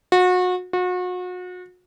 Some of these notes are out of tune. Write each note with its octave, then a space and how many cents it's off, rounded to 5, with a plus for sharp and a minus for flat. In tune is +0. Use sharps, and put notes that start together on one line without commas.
F#4 -30
F#4 -35